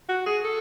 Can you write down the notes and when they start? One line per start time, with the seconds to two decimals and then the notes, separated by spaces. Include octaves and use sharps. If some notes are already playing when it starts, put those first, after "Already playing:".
0.09 F#4
0.26 G#4
0.44 A4